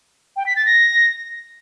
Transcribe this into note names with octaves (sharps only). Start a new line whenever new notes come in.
G5
B6
A6
A#6